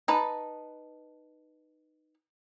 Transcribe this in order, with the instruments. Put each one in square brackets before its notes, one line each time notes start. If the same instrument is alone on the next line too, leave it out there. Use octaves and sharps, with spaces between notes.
[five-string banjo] D#4 B4 A5